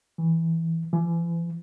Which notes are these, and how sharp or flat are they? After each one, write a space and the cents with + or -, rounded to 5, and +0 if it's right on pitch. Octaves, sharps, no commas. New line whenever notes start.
E3 -5
E3 +40